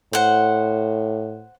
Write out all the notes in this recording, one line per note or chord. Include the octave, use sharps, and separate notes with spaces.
A2 C5 F#5